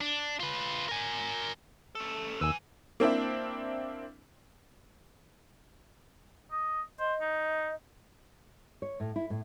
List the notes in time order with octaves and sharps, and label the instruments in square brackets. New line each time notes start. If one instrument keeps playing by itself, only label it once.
[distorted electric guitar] D4
F4 B4
A#4 G#5
[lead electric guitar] C#4 A4
[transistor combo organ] D#2 E6 [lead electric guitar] B4 G#5
[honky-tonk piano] A#3 C4 D4 E4
[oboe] D#5
[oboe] C5 [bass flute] D#5
[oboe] D#4
[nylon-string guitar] C#5
A2
E4
A2